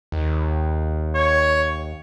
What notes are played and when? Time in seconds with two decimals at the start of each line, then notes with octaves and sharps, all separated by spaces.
0.12 D#2
1.16 C#5